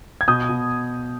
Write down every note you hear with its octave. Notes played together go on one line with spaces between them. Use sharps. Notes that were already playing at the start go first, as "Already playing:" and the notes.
G#6
B2 D#6 G6
B2